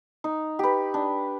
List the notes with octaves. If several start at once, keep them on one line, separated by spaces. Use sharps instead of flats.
D#4
G4 B4
D4